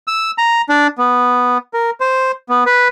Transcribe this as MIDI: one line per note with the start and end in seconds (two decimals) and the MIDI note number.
0.07 0.31 88
0.38 0.62 82
0.69 0.87 62
0.98 1.58 59
1.74 1.91 70
2.00 2.32 72
2.49 2.64 59
2.66 2.88 71